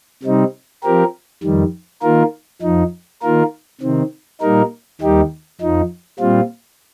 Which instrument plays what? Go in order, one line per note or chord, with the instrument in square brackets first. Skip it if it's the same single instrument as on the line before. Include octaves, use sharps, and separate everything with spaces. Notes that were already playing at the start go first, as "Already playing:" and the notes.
[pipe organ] C3 G3 C4 D#4
F3 C4 G4 A#4
F2 D#3 G3
D#3 A#3 F4 A#4
F2 F3 D#4
D#3 A#3 F4 A#4
C3 D#3 C4
A#2 G3 A#3 D#4 A#4
D#2 D#3 G3 D#4 G4
F2 F3 D#4
A#2 G3 C4 F4